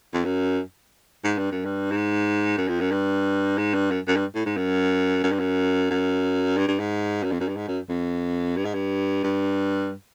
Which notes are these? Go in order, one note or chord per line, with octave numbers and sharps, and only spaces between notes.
F2
F#2
G#2
G2
F#2
G2
G#2
F#2
F2
F#2
G2
G#2
G2
F#2
F#2
G2
A2
G#2
F#2
F#2
G2
F#2
F#2
G2
G2
G#2
F#2
F2
F#2
G2
G#2
F#2
F2
G2
G#2
G2
G2